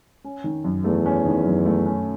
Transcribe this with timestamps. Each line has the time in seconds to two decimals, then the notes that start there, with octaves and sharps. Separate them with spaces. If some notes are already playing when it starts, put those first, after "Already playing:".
0.24 C#4
0.44 D#3
0.64 F#2
0.84 E2 A3
1.06 C#4
1.25 D#3
1.45 F#2
1.66 A3
1.86 C#4